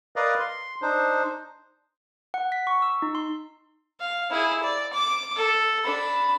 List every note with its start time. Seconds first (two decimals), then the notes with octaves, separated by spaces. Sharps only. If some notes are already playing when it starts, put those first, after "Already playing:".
0.16 A#4 B4 D5 D#5 F5
0.40 C6
0.82 D4 D#4 C5
2.34 F#5
2.52 B6
2.67 C#6
2.82 E6
3.02 D#4
3.15 C6
4.00 F5
4.30 E4 G#4
4.63 D5
4.93 D6
5.36 A4
5.84 D4 B5